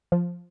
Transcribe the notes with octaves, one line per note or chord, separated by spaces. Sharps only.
F3